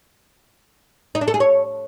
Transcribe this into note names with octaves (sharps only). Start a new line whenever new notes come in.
D#4
D4
A4
G#4
C#5